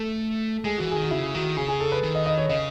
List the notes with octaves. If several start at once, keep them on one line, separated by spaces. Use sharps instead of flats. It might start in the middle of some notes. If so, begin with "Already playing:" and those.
Already playing: A3 A4
G#3 G#4
E3 F#4
D#3 G#4
F#4
C#3 E4
D#3 F#4
C#3 G#4
G#4
A4
B4
D#3
D#5
D#5
C#5
C#3 D#5